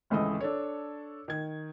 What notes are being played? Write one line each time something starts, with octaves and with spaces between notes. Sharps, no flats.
G#1 C#2 E3 A4 D#5 D#6
D4 A4 C#5
D#3 G#6